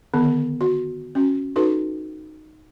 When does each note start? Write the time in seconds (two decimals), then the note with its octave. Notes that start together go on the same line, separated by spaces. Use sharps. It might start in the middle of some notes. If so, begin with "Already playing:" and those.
0.14 D3 D#3 B3
0.61 F#4
1.15 C#4 F#4
1.56 D#4 F#4 A4 B4